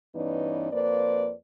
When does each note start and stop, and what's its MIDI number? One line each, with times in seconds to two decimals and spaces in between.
0.15 0.70 43
0.15 0.70 52
0.15 0.70 59
0.15 0.70 61
0.15 0.70 63
0.15 0.70 74
0.72 1.33 41
0.72 1.33 58
0.72 1.33 71
0.72 1.33 72
0.72 1.33 74